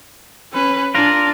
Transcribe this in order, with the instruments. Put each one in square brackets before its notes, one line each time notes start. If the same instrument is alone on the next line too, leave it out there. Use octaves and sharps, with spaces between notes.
[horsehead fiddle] C#4 B4
[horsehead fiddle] D4 [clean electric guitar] F4 A#4